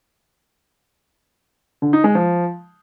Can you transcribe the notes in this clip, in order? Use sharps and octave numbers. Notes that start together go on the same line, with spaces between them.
D3
D#4
G#3
F3